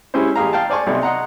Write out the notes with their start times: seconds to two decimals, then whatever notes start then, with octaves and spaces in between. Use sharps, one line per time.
0.14 G#3 C#4 E4 G4 C5
0.36 A1 G4 G#4 F5 A#5
0.53 F5 G5 A5
0.70 C5 D5 G#5 A5 C#6
0.87 B1 C3 D#4 D5
1.01 D#5 F#5 A#5 C6